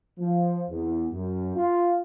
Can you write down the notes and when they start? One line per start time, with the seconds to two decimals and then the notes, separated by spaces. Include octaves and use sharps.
0.19 F3
0.69 E2
1.12 F#2
1.56 F4